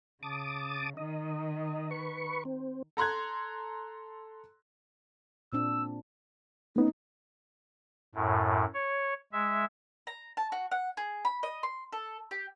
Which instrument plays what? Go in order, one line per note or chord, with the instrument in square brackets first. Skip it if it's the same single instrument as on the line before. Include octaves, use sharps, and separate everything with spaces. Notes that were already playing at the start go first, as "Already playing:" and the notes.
[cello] C#3 [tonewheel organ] A5 D6 D#6
[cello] D#3 [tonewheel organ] D#5
[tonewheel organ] B4 C#6
C4
[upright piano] A4 A#5 C6 F#6 G#6
[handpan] A#2 C4 D4 [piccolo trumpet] E6
[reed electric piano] A3 B3 C#4 [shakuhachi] D#4
[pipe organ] F#2 A2
C#5
G#3 E5
[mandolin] A#5
A5
F#4
F#5
G#4
B5
D#5
C6
A4
G4